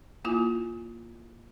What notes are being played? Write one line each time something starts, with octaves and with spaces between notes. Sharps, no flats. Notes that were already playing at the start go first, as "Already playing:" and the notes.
A#3 E4 F4 G#5